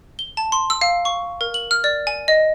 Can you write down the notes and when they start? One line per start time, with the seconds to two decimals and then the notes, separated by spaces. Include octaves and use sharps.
0.19 G7
0.37 A5
0.52 C6
0.70 E6
0.81 F5
1.05 C#6
1.41 A#4
1.54 F#7
1.71 F6
1.84 D5
2.07 G#5
2.28 D#5